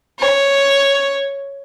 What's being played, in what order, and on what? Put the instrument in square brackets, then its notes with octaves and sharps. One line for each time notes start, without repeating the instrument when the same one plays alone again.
[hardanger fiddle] C#5